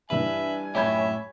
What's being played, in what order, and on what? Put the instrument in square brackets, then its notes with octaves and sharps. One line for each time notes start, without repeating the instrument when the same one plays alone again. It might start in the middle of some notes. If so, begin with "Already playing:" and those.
[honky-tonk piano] G2 E3 [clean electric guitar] B4 [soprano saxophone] E5 [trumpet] G#5
[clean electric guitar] F#2 A2 G4 [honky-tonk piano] C#5 B5 G#6 [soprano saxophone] E5